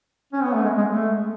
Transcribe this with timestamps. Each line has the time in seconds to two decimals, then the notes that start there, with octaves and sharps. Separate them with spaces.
0.33 C#4
0.43 B3
0.54 A3
0.63 G#3
0.78 G#3
0.92 A3